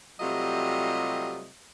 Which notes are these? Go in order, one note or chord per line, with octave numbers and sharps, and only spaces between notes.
C3 F#3 G3 A3 F4 D#5